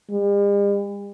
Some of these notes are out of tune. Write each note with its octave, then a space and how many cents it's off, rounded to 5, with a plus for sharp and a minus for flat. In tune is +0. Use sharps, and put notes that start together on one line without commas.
G3 +45